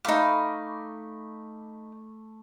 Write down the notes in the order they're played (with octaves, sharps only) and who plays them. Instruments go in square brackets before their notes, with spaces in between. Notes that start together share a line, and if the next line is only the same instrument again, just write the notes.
[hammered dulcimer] A3 B5 D6 [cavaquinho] D#4 F5